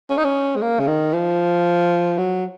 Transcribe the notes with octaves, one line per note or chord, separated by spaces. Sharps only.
C#4
D#4
C#4
G#3
A#3
C#3
D#3
F3
F#3